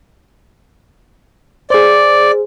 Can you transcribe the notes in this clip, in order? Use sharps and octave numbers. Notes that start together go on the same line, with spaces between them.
G#4 C5 D5